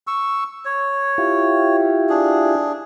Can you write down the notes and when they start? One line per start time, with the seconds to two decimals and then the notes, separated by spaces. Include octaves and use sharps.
0.07 C#6 E6
0.65 C#5
1.18 E4 F4 G4
2.09 D4 G#4